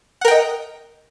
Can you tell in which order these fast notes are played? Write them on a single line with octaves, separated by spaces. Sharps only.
F#5 A#4 G5 D#5